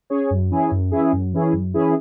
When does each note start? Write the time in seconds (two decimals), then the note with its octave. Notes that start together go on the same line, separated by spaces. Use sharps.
0.10 C#4 G#4 C#5
0.30 F#2
0.51 E3 C#4 E4 G#4
0.71 F#2
0.91 E3 C#4 E4 G#4
1.13 F#2
1.33 E3 C#4 E4 G#4
1.53 F#2
1.74 E3 C#4 E4 G#4